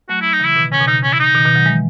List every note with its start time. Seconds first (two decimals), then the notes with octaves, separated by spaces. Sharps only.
0.09 F#3 A3 F#4
0.21 E4
0.33 D#4
0.40 C#3 E3 E4
0.56 B2 D#3
0.72 C#3 C#4
0.81 B2
0.87 C#3 D#4
1.03 C#4
1.13 E4
1.20 D#4
1.35 B2 D#3
1.45 B2 D#3
1.56 D#3 F#3
1.66 E3 G#3